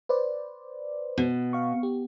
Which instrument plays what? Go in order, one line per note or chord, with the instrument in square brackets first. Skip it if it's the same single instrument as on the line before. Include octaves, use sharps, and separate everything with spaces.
[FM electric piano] B4 C5 D5
[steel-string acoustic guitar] B2
[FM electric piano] F5 C#6
G4